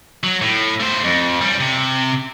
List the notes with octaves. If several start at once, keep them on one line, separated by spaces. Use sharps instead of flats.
F#3
A2
A3 C5
F2
G3 C#4
C3